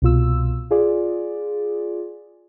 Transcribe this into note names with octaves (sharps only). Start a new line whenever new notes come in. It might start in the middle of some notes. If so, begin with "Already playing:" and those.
C2 B2 F4 E6
F4 G#4 D5